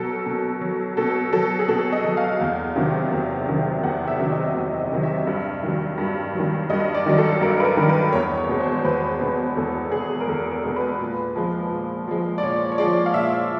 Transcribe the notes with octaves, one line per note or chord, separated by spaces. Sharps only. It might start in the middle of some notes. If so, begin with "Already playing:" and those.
Already playing: B2 F#3 A4 A#4
B2
F#3
B2 A4
F#3 A4
G#4
B2 A4
D#5
F#3
F5
E2
C3 D#3 F#3
E2
C3 D#3 F#3
E2 F#5
E5
C3 D#3 F#3
D#5
E2
D#5
C3 D#3 F#3
E5
G2
D#3 F#3
G2
D#3 F#3
G2 D#5
D5
D#3 F#3
A4
G2 A#4
B4
A#4
D#3 F#3
B4
E2 C#5
C#5
B2 G#3
C5
E2 B4
B2 G#3
E2 A4
B2 G#3 G#4
A#4
E2 A4
A#4
B2 G#3
B4
A#2
F3 G#3
A#2
F3 G#3
D5
A#2 C#5
C#5
F3 G#3 D5
F5
A#2 E5